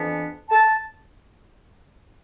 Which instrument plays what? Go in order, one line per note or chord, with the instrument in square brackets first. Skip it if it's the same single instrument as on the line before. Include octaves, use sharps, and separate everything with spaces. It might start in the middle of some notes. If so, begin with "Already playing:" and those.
Already playing: [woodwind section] F2 E3 B3 D4
A5